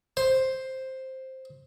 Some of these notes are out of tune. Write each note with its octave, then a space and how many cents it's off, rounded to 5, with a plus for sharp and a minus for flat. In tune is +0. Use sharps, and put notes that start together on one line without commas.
C5 +5